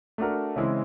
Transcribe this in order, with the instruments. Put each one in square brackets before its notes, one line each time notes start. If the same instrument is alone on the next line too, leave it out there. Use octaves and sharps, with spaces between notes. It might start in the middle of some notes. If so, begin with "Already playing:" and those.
[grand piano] A3 D4 F#4 A#4
C#3 E3 G#3 C4 E4